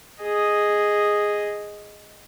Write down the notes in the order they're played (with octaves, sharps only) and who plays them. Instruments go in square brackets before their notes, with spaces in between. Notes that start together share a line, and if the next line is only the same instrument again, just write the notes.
[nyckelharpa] G#4 D#5